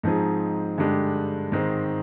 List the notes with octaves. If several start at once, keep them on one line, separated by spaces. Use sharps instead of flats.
G#2 F3 C4 D#4 G#4
G2 D3 G#3 D4 G4
G#2 D#3 G#3 C4